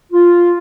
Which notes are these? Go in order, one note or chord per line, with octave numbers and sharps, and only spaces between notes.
F4